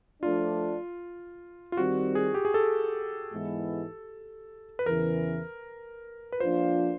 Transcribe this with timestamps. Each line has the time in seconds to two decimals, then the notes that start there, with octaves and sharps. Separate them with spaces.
0.23 F3 A3 D4 F4
1.72 F4
1.77 D#3 G3 C4 F#4
2.15 G#4
2.34 G4
2.45 G#4
2.54 A4
3.32 G#2 E3 G#3 B3 E4
4.79 B4
4.86 E2 C#3 E3 A#4
6.32 B4
6.40 F3 A#3 D4 F4 C5